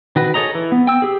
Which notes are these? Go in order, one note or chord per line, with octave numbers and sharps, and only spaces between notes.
D#3 F#4 B4
G#4 A4 C#5 D#5 A#5
E3
B3
G5 E6
G4 G#4